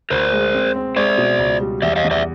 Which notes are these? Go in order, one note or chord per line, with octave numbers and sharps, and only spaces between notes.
D2 A#4 C5
G#3
C4
C4
G#3 C5 D5
B2
C#2
G3
E2 D5 E5
D#5 F5
E2
D5 E5